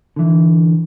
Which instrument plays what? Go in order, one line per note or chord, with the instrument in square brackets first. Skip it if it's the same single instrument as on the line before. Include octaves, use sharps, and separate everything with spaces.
[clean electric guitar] D3 E3